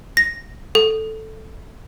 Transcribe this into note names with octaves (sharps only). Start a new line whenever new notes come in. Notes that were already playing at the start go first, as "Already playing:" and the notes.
A#6
A4